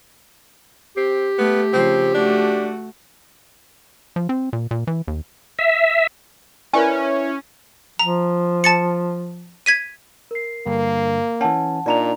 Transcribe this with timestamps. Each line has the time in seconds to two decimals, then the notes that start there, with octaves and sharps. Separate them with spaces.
0.97 C4 G4
1.38 A3 B3
1.73 C#3 F3 C4
2.14 A3 D4 F#4
4.16 F3
4.29 C4
4.53 A#2
4.71 A#2
4.87 E3
5.08 D#2
5.59 E5
6.73 C#4 E4 A#4 B4 D5 G#5
7.99 F3 A#5
8.64 A5 A6 C#7
9.66 G#6 B6 D#7
10.31 A#4 C7
10.67 G2 D3 A#3
11.41 E3 C#4 F#5 A5
11.86 A#2 D4 D#4 D5 A#5 F7